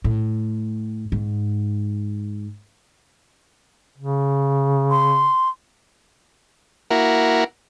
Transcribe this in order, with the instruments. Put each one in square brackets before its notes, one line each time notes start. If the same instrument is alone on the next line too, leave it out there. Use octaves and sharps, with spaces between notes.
[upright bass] A2
G#2
[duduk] C#3
[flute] C6
[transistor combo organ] A#3 E4 F#4 A#4